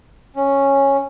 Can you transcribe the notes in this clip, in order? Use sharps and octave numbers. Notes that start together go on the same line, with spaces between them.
C#4